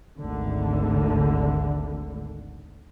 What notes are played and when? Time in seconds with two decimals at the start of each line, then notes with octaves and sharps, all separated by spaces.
0.19 G#1 D2 D3